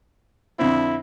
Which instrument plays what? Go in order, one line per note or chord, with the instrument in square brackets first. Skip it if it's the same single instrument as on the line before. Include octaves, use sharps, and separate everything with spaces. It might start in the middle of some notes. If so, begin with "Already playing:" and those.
[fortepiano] F2 D3 C4 [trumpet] E4